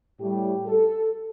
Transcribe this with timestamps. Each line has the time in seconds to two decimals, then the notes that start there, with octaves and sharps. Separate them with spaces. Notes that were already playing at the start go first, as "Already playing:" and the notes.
0.19 A2 G3 G4
0.66 A4